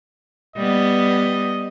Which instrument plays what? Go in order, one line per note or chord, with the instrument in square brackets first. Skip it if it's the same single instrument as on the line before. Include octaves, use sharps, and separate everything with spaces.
[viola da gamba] G3 B3 [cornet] D#5